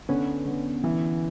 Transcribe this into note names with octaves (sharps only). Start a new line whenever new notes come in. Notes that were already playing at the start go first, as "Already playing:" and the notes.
D3 B3 C#4
D3
E3